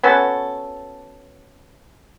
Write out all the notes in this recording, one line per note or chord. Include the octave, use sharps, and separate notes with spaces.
B3 C#4 F#4 A4